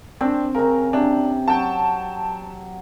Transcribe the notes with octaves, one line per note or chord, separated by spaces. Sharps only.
C4 D4
C#3 A#4 A#5
C3 D4
F#3 G5 A5